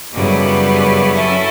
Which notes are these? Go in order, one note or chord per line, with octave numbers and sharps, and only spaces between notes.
F#2 C#3 G3 B3 E4
F#3 C#4 E4 A4